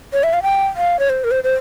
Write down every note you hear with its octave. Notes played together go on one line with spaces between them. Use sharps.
C#5
E5
F5
G5
F5
C#5
C5
A#4
C5
C5